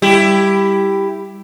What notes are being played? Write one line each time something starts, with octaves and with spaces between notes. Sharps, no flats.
G3 E4 G4